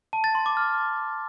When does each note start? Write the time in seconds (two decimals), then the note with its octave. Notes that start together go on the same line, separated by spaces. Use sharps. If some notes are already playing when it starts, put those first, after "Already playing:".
0.13 A5
0.24 A6
0.35 C6
0.46 D6
0.57 F6